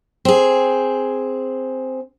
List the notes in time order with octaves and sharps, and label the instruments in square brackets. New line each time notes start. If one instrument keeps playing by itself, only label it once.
[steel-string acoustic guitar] C4 G#4